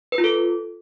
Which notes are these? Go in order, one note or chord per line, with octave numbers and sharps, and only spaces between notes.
B4
F4
A4